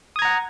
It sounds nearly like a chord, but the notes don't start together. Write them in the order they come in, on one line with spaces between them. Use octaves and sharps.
D#6 G#6 A#5 F#5